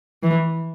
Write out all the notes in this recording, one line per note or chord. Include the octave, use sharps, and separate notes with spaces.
E3